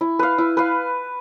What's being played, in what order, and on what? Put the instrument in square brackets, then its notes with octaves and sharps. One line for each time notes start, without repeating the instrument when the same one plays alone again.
[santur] E4
B4 F5
E4
B4 F5